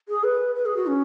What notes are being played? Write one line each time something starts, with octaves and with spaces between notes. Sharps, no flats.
G#4
B4
B4
G#4
F#4
C#4